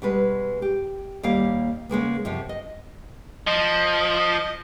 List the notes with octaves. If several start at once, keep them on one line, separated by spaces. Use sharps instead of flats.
B2 G3 G#3 B4
G4
D#2 G3 A#3 F5
C#3 G#3 A#3 B3
F#2 C3 F3
D#5
F3 D#5